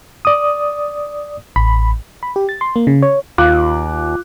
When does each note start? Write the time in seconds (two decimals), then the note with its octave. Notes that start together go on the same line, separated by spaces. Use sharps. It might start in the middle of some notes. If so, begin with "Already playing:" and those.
0.25 D5 D#6
1.56 A1 B5
2.23 B5
2.36 G4
2.49 A6
2.61 C6
2.76 A#3
2.87 C#3
3.03 C#5
3.38 D#2 F4 F5 D6 F#6